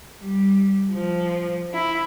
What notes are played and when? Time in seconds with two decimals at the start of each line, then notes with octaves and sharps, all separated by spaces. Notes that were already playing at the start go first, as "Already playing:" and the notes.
0.21 G3
0.93 F3
1.72 E4